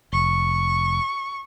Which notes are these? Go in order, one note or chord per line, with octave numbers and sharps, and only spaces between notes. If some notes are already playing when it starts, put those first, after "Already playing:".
F1 C#6